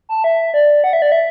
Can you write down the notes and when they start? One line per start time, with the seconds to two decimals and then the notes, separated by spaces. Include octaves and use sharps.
0.09 A5
0.24 E5
0.54 D5
0.84 F#5
0.93 E5
1.02 D5
1.12 E5